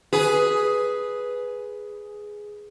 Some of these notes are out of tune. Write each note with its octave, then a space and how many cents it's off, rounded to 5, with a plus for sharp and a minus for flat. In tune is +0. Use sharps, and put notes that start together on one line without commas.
G#4 +5 B4 +0